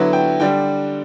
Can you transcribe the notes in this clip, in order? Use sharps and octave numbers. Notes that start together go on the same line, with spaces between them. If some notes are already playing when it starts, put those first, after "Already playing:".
Already playing: D3 F#3 B3 E4
G5
D3 G3 D4 G5